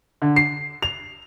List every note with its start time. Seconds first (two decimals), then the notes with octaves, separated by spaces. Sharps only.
0.22 D3
0.36 C7
0.82 F7